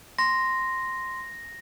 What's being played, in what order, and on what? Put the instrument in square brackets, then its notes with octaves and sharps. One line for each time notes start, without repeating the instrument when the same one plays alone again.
[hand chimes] C6 [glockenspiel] A#6